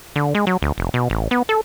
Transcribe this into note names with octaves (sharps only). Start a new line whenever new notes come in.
D3
G#3
F#3
D2
F1
B2
A1
B3
A4